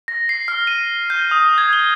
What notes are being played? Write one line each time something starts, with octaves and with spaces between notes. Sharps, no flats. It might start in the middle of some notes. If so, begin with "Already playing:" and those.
A#6
C7
F6
D#7
G6
D#6
G#6
G7